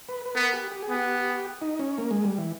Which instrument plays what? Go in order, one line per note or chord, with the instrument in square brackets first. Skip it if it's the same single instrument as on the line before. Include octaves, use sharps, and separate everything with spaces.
[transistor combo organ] B4
B4
[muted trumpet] B3 [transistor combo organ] A#4
[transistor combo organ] G4
G4
G#4
[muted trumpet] B3 [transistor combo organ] G4
[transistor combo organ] D#4
C#4
A#3
G#3
G3
E3